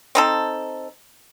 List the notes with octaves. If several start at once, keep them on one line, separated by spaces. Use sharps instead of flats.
C4 D#4 A4